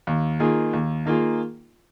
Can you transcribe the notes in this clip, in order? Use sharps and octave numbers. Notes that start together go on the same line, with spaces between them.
D#2
D#3 A#3 F4 G#4
D#2
D#3 A#3 F4 G#4